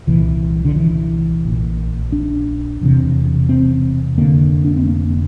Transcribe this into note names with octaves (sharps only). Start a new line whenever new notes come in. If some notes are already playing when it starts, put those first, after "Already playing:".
C2 A#2 E3
D3
E3
A#1 A#2
D4
E1 E2 C3
C4
F1 F2 D3 A#3
D4
C4
A#3